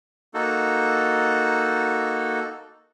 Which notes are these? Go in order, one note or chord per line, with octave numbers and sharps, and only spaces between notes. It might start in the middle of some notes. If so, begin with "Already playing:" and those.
A#3 D#4 F#4 A4